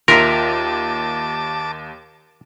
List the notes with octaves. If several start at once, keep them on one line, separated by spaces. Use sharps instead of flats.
D#2 F4 A#4 E5 A5 A#5 D6